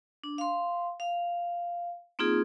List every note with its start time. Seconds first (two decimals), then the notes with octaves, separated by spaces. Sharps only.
0.24 D4
0.38 F5 C6
1.00 F5
2.19 A#3 C4 D#4 F4 G#4